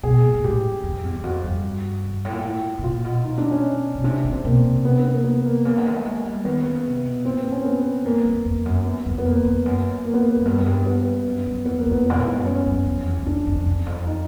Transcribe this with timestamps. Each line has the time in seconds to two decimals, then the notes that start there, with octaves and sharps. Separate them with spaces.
0.03 B2 G#4
0.23 A#2
0.34 A#2
0.44 A2 G4
0.83 F2
1.03 E2
1.16 E2
1.23 F2 F#4
1.43 G2
2.05 G2
2.25 A2
2.32 A#2
2.40 A2
2.79 B2
2.84 A#2 F4
3.04 B2
3.24 D#4
3.38 D4
3.51 C#4
3.95 B2
4.04 C3 D4
4.25 C#3
4.31 C4
4.45 B2 A#3
4.64 C3
4.85 B3
4.98 B3
5.12 A#3
5.24 B3
5.45 A#3
5.65 C#3 A#3
5.78 D3
5.85 D#3
5.96 A3
6.05 G#3
6.25 G3
6.45 D#3 B3
6.64 C#3
6.85 C3
7.05 B2
7.25 A#2 C4
7.38 B3
7.52 C#4
7.65 B3
8.05 G#2 A#3
8.25 F2
8.45 F2
8.65 F#2
8.85 B3
9.06 F2
9.18 B3
9.26 F2 A#3
9.45 F2
9.65 F#2
10.05 A#3
10.14 B3
10.21 A#3
10.37 F#2
10.45 G2 B3
10.58 F#2
10.66 G2
10.86 B3
11.26 F#2
11.46 F#2
11.65 F2 B3
11.79 A#3
11.86 F2 B3
12.06 A#2 B3
12.18 A2
12.27 G#2
12.36 G2
12.45 F#2 C#4
12.66 F#2
12.86 F2
13.05 E2
13.19 E2
13.26 F2 D4
13.47 F2
13.67 E2
13.86 F2
14.07 D#4